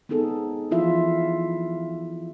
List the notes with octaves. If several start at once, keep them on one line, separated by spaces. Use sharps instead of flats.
B3 C4 D#4 G#4 A4
E3 F3 E4 F4 E5